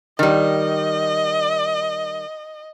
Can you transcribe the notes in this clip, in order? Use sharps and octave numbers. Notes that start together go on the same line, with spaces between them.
D#3 G3 D#5